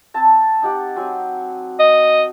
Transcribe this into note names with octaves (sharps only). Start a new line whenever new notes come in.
C4 A5
D#4 G4 F#5
F#3 C4 G#5
D#5